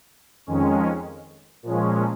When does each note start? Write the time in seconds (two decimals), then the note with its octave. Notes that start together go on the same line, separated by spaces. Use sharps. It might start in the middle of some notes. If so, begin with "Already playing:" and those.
0.46 F2 D#3 G#3 C#4
1.63 A#2 F3 G#3 C#4